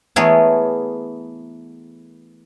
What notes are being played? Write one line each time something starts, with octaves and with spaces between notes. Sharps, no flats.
E3 A3 B3 G#4 A#4 C#5